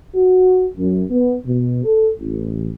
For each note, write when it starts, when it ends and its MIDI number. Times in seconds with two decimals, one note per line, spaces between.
0.15 0.64 66
0.78 1.02 42
1.09 1.34 59
1.45 1.81 47
1.84 2.09 69
2.19 2.69 33